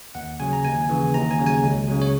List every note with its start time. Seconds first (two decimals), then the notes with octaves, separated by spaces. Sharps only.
0.15 D#2 F#5
0.40 C#3 F#3 G#5
0.53 A#5
0.65 D#2 G#5
0.89 C#3 E3
1.14 D#2 A#5
1.31 G#5
1.39 C#3 F#3
1.46 G#5
1.63 C#2
1.88 C#3 F#3
2.02 C#5